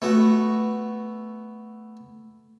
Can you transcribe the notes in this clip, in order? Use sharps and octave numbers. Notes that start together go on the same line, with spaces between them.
A3 B3 F#4